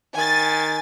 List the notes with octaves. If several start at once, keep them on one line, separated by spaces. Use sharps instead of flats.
D#3 G#5 A6